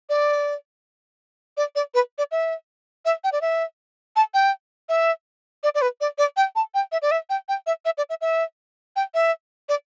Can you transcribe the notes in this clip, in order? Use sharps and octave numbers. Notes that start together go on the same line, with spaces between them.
D5
D5
D5
B4
D5
E5
E5
G5
D5
E5
A5
G5
E5
D5
D5
B4
D5
D5
G5
A5
G5
E5
D5
E5
G5
G5
E5
E5
D5
E5
E5
G5
E5
D5